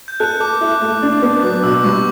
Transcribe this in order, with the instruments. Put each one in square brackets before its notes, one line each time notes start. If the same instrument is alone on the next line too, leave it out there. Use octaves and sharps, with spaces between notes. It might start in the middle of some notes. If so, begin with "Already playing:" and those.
[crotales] G6
[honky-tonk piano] A4 [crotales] F#6
[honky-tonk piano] A4 [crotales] D6
[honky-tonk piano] E4
A3
D4
B3
[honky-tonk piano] F#3 [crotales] D6
[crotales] D6
[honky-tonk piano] B2 [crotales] E6
[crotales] E6
[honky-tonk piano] G3 [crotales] C#6